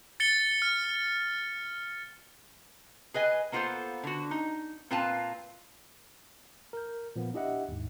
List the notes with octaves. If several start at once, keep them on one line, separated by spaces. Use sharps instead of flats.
A6 C#7 G7
F6
G#4 B4 D#5 G#5
A#3 B3 F4 F#4 A4 C5
D3 F#4
D#4
A#2 C4 F4 B4 F5 A5
A#4 G6
A#2 F3 A#3 B3
D4 E4 G4 D#5 E5 F#5
D#2 G#2